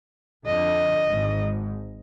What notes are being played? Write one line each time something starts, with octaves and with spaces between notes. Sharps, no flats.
F2 D3 D#5
G#1 G#2